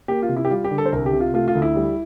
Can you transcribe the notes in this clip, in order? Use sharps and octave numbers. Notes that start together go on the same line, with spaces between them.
A#3 G4
F4
C3
E4
G4
G3 F4
G4
D3
A4
C5
C2 A#4
G4
C3
F4
A3 F4
F4
D2
E4
G3